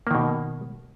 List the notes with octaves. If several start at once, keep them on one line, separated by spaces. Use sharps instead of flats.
B2 D#3 A#3